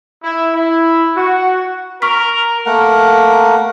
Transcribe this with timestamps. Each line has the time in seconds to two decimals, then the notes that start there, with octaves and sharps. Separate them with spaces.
0.23 E4
0.53 E4
1.15 F#4
2.02 A#4 C#6 F6 B6
2.66 A3 A#3 A#4 F#5